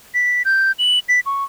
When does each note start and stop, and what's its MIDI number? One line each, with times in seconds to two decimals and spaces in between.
0.14 0.42 95
0.45 0.72 91
0.79 0.99 102
1.09 1.20 95
1.26 1.44 85